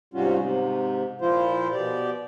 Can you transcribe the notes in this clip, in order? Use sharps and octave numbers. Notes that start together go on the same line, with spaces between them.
G#2 C3 G3 C#4 F4 F#4
G#2 C3
A#2 F3 E4 F4 C5
B2 G4 D5